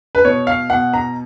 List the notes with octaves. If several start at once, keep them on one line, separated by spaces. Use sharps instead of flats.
B4
B2 C#5
F5
B2 F#5
A#5